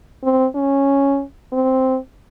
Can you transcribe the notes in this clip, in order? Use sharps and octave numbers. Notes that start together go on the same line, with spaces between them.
C4
C#4
C4